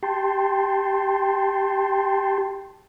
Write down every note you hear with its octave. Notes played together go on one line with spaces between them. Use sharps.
G4 G5 A5 C6